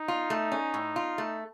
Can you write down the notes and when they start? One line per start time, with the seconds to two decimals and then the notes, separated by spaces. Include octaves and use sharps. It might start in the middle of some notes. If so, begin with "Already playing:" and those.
Already playing: D#4
0.08 F4
0.30 A3
0.52 C#4
0.74 A2
0.96 F4
1.18 A3